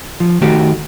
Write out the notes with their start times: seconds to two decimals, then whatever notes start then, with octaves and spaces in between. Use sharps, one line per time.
0.20 F3
0.42 D#3 A3 F#4 G4